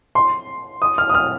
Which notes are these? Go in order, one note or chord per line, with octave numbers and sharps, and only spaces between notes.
C6
D#6
F6
D#6
F6